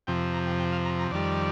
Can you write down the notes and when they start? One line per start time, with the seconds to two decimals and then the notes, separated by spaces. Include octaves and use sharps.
0.07 F2 C3 F3 G5
0.34 A#5
0.47 G5
0.59 G5
0.72 F5
0.85 A#5
0.99 A#5
1.11 F2 D#3 G3 D5